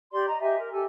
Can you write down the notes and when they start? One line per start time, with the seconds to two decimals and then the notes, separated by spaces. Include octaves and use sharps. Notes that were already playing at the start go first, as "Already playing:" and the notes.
0.11 G4 D5 C6
0.26 D#5 A#5
0.40 G4 D#5 E5 G#5
0.58 A#4
0.71 G4 A4 G#5